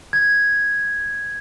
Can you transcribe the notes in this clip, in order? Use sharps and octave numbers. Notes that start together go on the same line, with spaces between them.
G#6